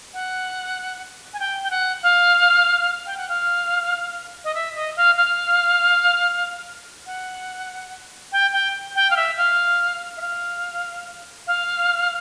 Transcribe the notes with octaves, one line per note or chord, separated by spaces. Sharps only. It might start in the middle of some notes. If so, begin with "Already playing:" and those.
F#5
G#5
G5
G5
F#5
F5
G5
F#5
F5
D#5
E5
D#5
F5
F5
F#5
G5
G5
G5
F5
E5
F5
E5
F5
F5